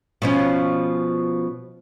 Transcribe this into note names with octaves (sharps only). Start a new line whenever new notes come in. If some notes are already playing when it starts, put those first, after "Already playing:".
B2 F3 C#4